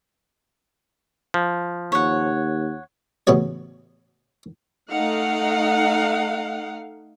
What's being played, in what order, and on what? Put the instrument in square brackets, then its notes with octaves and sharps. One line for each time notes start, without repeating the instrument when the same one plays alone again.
[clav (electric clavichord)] F3
[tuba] D#2 [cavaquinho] C#5 F#5
[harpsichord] A1 C#3 B3 F#4 C#5
[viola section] A3 D#4 F5 F#5